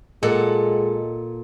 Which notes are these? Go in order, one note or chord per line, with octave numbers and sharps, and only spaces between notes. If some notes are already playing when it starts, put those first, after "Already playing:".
A#2 G#3 A4 F#5